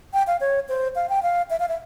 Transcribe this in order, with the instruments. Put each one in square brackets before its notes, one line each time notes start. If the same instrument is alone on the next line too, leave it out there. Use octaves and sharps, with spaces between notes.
[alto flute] G5
F5
C#5
C5
F5
G5
F5
E5
F5
E5